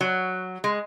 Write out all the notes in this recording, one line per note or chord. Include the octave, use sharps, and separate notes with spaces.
F#3
G#3